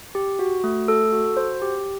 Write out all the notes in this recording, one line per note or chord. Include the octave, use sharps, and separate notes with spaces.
G4
F#4
A3
A4
F#4
C5
G4